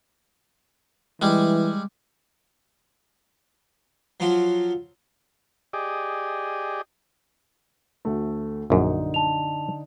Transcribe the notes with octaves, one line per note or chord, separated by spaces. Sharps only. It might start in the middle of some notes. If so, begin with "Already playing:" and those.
E3 G3 G#3
F3 F#3 F4 F#4
G4 G#4 D5 D#5
D2 A3
A#1 F#2 D3 D#4
A5 F7